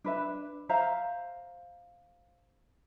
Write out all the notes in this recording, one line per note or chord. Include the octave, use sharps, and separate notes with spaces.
D4 B4 E5
C5 E5 F5 A#5